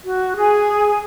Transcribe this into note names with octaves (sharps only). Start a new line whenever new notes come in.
F#4
G#4 G#5